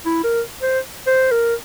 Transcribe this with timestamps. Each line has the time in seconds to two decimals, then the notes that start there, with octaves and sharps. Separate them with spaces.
0.05 E4
0.24 A#4
0.62 C5
1.07 C5
1.31 A#4